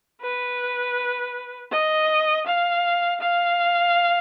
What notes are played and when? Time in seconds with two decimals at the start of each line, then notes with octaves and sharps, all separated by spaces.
0.22 B4
1.72 D#5
2.46 F5
3.21 F5